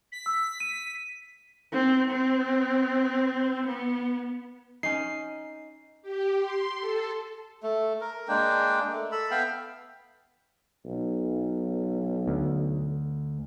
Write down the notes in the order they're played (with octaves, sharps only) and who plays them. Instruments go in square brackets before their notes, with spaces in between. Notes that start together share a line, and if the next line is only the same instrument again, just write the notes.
[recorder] B6
[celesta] E6
D#7
[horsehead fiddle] C4
C4
B3
[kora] C#4 D#4 [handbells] C7
[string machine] G4
C6
A4
[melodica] A3
A#4
G#3 A#3 D4 G5
A3
A4 B5 E6
B3 E5 F5 G5
[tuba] B1
[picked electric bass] D2